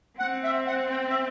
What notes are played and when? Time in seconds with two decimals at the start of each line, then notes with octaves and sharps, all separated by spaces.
0.19 C4 F#5
0.44 E5
0.67 F#5
0.91 G5
1.09 E5